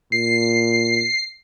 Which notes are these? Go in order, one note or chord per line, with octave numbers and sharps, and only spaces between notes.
A#2 C7